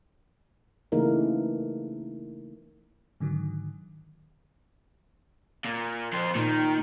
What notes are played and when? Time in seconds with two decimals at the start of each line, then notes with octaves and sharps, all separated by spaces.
0.92 C#3 E3 A3 A#3 D#4 A#4
3.20 G#2 D3 D#3 F#3
5.65 A#2
6.13 F2 C5
6.35 A#2 D#3